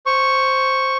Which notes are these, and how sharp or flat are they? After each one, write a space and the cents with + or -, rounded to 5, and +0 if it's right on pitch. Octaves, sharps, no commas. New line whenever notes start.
C5 +0 C#6 +0